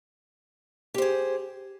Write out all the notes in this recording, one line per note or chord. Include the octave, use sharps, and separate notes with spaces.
G4 G#4 C5